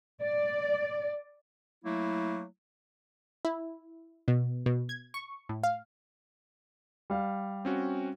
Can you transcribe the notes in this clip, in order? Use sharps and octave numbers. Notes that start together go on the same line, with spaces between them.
D5
F#3 A3 A#3 E4
E4
B2
B2
G#6
C#6
A2
F5
G3 F5
C4 C#4 F#4